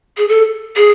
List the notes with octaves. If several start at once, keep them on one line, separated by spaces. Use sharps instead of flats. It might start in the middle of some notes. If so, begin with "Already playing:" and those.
G#4
A4
G#4